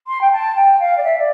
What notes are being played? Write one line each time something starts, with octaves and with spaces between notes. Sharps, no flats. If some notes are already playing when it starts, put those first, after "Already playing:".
C6
G5
A5
G5
F5
D5
E5
D5